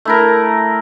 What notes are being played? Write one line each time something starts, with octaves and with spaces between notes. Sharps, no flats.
A3 E4 A#4